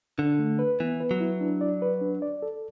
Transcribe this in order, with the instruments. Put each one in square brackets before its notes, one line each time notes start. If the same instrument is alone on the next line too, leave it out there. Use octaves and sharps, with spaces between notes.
[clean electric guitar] D3 [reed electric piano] D4
[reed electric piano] A3
B4
[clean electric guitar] E3 [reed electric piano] B3
[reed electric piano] B4
[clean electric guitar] F#3
[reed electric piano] E4
D4
D5
B4
D4
D5
A4